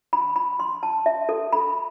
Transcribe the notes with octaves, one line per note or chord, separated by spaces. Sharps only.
B5
B5
C6
A5
E5
A4
B5